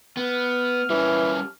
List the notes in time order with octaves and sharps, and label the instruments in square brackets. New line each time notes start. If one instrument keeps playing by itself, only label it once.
[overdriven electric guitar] B3 [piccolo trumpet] F6
[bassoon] E3 [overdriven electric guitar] G3 C#4